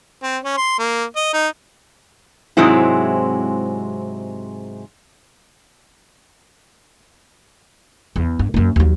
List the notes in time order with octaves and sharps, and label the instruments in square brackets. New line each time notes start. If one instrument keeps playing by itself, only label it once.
[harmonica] C4
C#4
C6
A#3
D#5
D#4
[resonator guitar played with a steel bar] G#2 C3 F#3 G#3 C4 E4
[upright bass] E2
G2
F#2 A#3
D#2 F#3